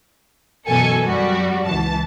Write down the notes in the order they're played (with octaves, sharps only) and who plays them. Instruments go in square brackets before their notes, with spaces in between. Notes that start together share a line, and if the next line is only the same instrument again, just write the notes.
[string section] F#2 B2 E3 A4 G#5 C#7
F#2 G3 F#4
C#2 E3 A5